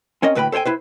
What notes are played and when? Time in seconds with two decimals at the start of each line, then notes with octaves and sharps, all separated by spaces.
0.22 C4 C#4 A#4 D#5
0.35 D2 A2 B4 G5 B5
0.52 A4 C5 C#5 G5 G#5
0.65 E4 B4 C5